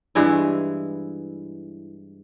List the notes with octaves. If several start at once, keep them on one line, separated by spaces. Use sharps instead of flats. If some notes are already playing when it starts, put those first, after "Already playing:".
G2 E3 G#3 E4